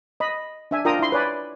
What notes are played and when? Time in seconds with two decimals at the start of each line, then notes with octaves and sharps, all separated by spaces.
0.20 D#5 B5
0.71 D4 E5 G#5
0.85 D4 F4 A#4 G5 A#5 D#6
0.99 E4 C6
1.12 B4 C#5 D5 G#5 B5